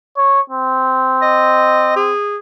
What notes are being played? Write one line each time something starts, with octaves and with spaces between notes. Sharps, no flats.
C#5
C4
D#5
G#4